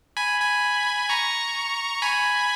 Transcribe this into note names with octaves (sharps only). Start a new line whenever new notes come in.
G#5 B5
G#5 B5
A#5 C#6
G#5 B5